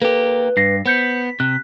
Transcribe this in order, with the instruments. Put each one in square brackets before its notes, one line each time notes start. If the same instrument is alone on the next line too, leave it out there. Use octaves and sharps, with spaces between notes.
[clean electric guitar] A#3 G4 [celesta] A4 [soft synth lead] B4
[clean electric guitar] G2 [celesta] A#6 C7
[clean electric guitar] B3 [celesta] C5 G6 C#7 [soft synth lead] B6
[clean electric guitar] C3 [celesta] F#6